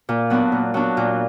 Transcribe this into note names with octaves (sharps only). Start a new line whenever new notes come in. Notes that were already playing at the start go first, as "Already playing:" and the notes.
A#2
F#3 B3 D4
A#2
F#3 B3 D4
A#2